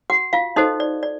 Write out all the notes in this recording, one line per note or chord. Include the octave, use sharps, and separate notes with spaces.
F#4 F#5
F4 F5
D#4 F#4 A4 C5 D#5
D5
D5